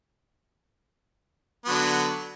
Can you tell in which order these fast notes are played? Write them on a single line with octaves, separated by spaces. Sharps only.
B3 F#3 D3